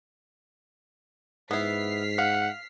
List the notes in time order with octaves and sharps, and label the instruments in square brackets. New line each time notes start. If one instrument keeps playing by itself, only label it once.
[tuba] G#2 [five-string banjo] B3 E4 [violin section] F6 B6 C7
[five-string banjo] F5 [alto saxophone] F#5